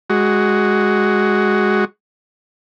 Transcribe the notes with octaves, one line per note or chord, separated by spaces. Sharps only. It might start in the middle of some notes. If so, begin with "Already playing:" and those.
G#3 F#4